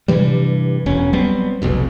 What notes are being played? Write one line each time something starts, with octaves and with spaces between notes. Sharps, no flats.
G2 C3 E3 G3
E1 C#4
F#3 G3 B3 C4
F1 B1 F2